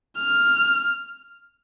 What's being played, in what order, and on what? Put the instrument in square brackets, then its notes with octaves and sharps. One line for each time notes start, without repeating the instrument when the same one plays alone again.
[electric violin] F6